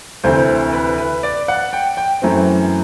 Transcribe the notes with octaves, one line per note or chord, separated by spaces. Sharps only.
D2 C3 E3 C5
B4
B4
D5
F#5
G5
G5
F#2 E3 A3 C4